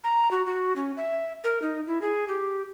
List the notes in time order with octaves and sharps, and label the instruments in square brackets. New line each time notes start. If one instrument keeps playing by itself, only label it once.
[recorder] A#5
F#4
F#4
C#4
E5
A#4
D#4
E4
G#4
G4